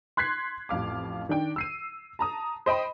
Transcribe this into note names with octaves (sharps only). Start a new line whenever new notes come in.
C6 F#6 G#6 B6 C7
A1 F2 F5 D6
D#3 D4 G5
E6 C7 D#7
A5 A#5 D#6
C5 D#5 G5 B5